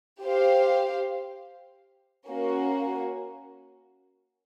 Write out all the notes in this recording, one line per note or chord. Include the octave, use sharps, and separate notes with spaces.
G4 C5 F5
A#3 C#4 F#4